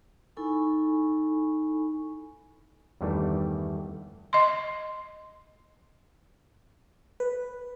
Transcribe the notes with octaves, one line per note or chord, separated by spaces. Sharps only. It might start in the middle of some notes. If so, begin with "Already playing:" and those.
D#4 E4 A4 G#5 B5 C#6
E2 G2 D#3 E3 G3 A3
D#5 C6
B4